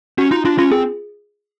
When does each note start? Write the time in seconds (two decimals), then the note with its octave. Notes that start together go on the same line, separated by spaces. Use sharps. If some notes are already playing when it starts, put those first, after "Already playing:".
0.18 C#4 F#4
0.31 D#4 F4
0.45 D4 F4
0.58 C#4 F4
0.71 C4 G#4